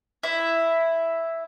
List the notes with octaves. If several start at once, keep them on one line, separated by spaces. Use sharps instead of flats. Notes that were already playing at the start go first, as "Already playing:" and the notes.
E4 E5